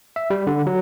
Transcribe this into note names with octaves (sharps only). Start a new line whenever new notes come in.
E5
G3
D3
F#3